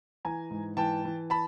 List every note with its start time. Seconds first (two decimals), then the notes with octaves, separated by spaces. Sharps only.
0.25 E3 G#5 A#5
0.50 G#2
0.77 E3 G5 A5
1.05 E3
1.30 A5 B5